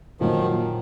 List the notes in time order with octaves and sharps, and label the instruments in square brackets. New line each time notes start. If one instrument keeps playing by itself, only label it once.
[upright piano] A#2 F#3 A#3 [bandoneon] D#3 F3